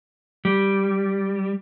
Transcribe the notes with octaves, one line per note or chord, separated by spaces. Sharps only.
G3